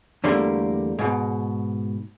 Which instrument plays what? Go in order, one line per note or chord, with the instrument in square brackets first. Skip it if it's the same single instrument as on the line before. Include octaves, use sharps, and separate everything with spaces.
[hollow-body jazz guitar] E2 D3 G3 A3 A#3
G#2 B2